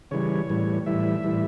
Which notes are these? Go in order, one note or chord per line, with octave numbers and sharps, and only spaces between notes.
C#3 E3 G3 C#5
A2 E3 G3
A2 E3 G3 E5
A2 E3 G3